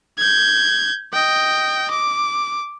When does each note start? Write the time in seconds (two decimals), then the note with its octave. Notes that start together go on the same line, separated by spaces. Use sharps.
0.18 G6 G#6
1.13 D#5 G5
1.91 D6